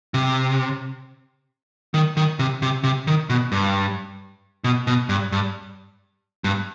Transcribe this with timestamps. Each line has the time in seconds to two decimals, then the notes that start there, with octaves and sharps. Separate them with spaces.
0.14 C3
1.94 D#3
2.17 D#3
2.39 C3
2.62 C3
2.84 C3
3.07 D#3
3.30 B2
3.52 G2
4.64 B2
4.87 B2
5.09 G2
5.32 G2
6.44 G2